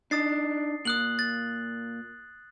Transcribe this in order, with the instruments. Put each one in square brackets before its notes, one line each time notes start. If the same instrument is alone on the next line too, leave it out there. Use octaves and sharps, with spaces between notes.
[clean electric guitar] D4 D#4 [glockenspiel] D#6 A6 C7
[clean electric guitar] A#2 [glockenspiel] D#6 F#6 F#7
[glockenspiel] A6